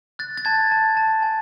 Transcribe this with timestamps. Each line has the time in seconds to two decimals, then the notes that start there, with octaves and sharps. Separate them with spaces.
0.19 F#6 A6
0.37 A6
0.45 A5 G#6
0.72 A5
0.97 A5
1.22 G#5